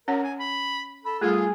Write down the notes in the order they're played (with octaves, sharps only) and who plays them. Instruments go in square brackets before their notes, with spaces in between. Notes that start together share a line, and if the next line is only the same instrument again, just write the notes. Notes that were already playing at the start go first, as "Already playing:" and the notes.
[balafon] C#4 C#5 F#5 [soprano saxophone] A#4
[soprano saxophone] G#5
B5
[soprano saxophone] A4 [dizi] B5
[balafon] G3 A3 [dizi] F4 [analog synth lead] G#4